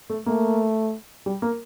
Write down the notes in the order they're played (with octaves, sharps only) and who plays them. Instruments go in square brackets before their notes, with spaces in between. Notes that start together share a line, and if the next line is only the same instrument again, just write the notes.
[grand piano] A3
[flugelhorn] A3 [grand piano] A#3
[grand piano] G3
A#3